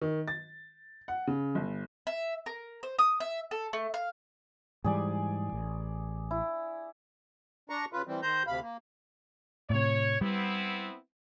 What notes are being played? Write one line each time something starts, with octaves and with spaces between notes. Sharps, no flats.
D#3
A6
F#5
C#3
G1
E5
A#4
C5
D#6
E5
A4
A3
F5
G#2 E3 G3 G#4 D5 G#5
A1
E4
D4 A#5 C#6
C#3 F4 B4
E3 G3 C4
D#3 C5 A#5 G6
D2 C3 F5 B5
A#3
A2 C3 C#5
G3 B3 C4 E4